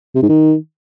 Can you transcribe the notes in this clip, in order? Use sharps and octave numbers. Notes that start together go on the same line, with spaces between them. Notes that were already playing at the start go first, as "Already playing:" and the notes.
C3
G#2
D#3